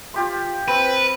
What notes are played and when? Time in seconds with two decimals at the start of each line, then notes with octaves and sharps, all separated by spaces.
0.14 F4 G4 C6
0.68 C4 B4